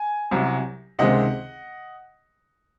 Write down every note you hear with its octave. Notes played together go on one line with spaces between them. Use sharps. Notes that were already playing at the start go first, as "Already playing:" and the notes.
Already playing: G#5
C2 C3 F#3
C#2 C3 D#3 G#3 C4 D#5 F#5